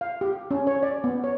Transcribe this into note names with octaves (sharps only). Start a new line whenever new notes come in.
F5
G4
C#4
C#5
D5
B3
C#5